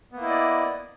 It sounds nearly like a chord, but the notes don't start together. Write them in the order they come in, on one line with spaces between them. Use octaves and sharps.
B3 A#3 E4 D#5 D5